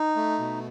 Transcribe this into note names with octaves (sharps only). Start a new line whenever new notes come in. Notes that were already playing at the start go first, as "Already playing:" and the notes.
Already playing: D#4
A3
B2